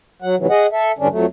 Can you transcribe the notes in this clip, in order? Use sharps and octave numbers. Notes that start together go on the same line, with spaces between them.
F#3 F#5
G#2 C3 E3 F#3
G#4 D#5 F#5
A4 E5
E2 G2 D3 C#4 D4
F2 F#3 A3